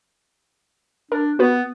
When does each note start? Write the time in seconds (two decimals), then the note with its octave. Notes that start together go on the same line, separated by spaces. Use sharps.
1.12 D4 A#4
1.39 B3 F#4 B4